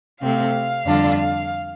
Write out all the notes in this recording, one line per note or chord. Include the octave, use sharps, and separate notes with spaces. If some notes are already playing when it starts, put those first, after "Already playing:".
C3 A3 C4 F5
F2 D3 G3 D4 F4
F5